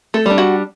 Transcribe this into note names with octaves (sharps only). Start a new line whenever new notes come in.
A3 A4
G3 D4
F#4 F#5